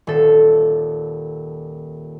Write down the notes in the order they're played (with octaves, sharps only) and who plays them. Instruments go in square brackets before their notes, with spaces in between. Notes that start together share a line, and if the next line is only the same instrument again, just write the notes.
[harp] D#1 A4